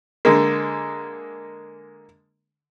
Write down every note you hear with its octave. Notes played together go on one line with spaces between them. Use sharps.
D3 G#3 A#3